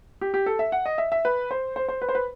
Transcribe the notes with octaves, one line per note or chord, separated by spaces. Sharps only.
G4
G4
A4
E5
F#5
D#5
E5
E5
B4
C5
C5
C5
B4
C5
B4